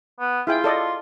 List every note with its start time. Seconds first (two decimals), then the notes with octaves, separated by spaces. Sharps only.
0.20 B3
0.47 E4 F4 G#4 G5
0.64 A4 D5 D#5